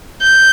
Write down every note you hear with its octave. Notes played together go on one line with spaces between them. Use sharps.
G6